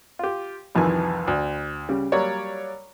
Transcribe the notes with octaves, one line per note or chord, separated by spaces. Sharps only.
F4 G4
C2 F2 D#3 E3 G#5
D2
C#3 G3
F#3 G3 A#3 C#5 D5